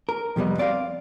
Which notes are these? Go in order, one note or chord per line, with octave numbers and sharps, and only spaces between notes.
A#4
F2 C3 G3 B3 D#5
C4 D5 D#5 F5